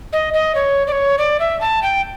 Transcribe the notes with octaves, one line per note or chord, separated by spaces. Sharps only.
D#5
D#5
C#5
D5
C#5
D5
E5
A5
G5